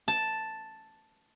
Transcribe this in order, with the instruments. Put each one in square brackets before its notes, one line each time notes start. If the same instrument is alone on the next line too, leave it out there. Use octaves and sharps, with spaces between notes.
[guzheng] A5